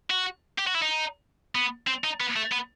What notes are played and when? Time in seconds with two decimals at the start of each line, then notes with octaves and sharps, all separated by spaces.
0.10 F#4
0.58 G4
0.67 F#4
0.74 E4
0.82 D#4
1.55 B3
1.87 C4
2.04 D#4
2.20 B3
2.36 A3
2.52 B3